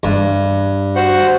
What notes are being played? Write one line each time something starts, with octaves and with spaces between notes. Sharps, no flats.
G2
F#4 C5 F#5